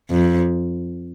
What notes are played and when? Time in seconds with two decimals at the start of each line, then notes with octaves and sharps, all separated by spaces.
0.10 F2